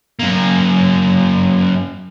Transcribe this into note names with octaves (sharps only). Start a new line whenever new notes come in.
F#2 A#3